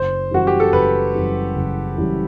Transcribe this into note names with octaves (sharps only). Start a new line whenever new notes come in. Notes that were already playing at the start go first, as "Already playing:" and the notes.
Already playing: F#1 C5
F#2 E3 G3 F#4
G4
A4
F#1 B4
F#2 E3 G3
F#1
F#2 E3 G3